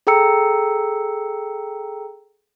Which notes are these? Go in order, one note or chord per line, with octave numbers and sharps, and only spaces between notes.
G#4 A4 G5 A#5 E6 C#7